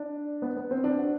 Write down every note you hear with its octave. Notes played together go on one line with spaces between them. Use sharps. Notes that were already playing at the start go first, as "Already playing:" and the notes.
Already playing: D4
B3
B3
C4
D4
F#4